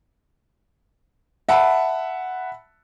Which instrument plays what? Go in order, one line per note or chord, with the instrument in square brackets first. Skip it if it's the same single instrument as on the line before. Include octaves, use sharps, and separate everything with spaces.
[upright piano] E5 F#5 A5 B5